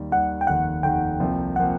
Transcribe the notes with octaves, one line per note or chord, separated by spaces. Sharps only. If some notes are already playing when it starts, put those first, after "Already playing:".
Already playing: D#2 D#3 G3
D#2 D#3 G3 F#5
G5
F1 D#2 D#3 F#5
F1 D#2 D#3 G5
C2 C3 F3 A#3
C3 F3 A#3 F#5